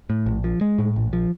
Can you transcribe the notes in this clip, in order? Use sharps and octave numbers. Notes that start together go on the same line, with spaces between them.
A2
A#1
F3
G#3
A2
A#1
F3